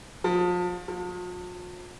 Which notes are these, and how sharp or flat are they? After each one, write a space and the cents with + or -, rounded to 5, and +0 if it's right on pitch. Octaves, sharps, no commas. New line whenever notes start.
F3 +35
F3 +45